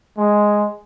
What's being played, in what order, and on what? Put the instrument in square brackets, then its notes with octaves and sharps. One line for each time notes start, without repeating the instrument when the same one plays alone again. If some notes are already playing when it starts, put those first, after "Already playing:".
[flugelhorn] G#3